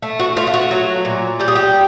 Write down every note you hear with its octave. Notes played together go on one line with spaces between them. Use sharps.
A3
F#4
A3 F4
F4
F#4
F#3
A#2
G3 G4
G#4
G4